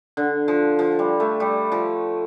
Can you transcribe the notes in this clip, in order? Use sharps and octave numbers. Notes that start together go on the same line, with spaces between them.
D3
F3
F3
G3
A3
G3
F3